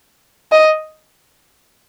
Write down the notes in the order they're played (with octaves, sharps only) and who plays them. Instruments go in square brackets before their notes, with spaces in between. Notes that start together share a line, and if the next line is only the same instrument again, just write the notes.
[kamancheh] D#5